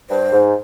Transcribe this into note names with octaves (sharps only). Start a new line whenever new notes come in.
G2 C5
G#2